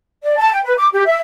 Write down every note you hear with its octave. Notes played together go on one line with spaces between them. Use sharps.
D5
A5
G5
B4
D6
G4
E5